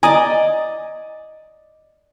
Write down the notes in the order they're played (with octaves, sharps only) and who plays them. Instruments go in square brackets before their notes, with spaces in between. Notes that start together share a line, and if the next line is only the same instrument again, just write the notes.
[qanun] D5 D#5 [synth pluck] G#5 A#5 D#6